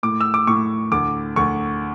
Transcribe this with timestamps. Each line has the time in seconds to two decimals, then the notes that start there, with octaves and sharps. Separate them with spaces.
0.03 A2 D6
0.20 E6
0.34 D6
0.47 A2 C#6
0.92 D2 D6
1.36 D2 C#6